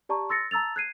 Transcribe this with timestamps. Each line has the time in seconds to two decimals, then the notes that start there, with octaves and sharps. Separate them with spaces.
0.09 G4 D5 A5 A#5 C#6
0.29 C6 E6 A6 A#6 C#7
0.51 A5 A#5 E6 A6 F7
0.76 F#6 G#6 C7 D#7